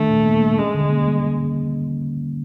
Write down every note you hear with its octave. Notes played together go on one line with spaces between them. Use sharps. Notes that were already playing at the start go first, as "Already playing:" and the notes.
Already playing: D#3 A3 D4
A#2
A#3
G3
G#3 C#4
D3
A#3
G3